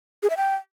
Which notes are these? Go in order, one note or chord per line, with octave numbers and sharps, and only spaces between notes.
G#4
E5
G5